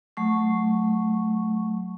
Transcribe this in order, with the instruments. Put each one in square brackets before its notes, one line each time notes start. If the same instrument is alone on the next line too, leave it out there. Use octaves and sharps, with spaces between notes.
[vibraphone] F#3 A3 C#6